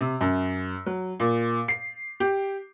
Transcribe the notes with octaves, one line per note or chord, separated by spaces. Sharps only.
C3
F#2
F#3
A#2
C7
G4